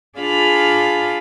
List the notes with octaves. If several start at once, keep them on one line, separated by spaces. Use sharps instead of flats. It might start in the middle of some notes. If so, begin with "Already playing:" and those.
D4 F4 G#4 F5 B5